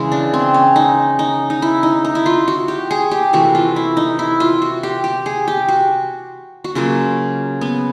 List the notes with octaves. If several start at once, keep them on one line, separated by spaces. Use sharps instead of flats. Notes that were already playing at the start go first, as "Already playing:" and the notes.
Already playing: C#3 E3 G#3
D4
C4
C#4
D#4
D#4
D#4
E4
D#4
D#4
E4
F4
F#4
G4
G#4
G4
C3 E3 A3 F#4
F4
E4
D#4
E4
F4
F#4
G4
G4
G#4
G4
F#4
F#4
C#3 F#3 A#3 F4
B3